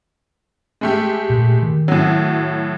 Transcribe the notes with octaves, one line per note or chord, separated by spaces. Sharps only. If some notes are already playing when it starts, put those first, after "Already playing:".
G#3 A3 G4
A#2
D#3
A2 F#3